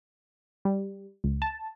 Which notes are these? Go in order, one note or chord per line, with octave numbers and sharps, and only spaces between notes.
G3
C#2
A5